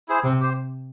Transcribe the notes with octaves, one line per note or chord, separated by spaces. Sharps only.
E4 G#4 C5
C3 C4
G4 C5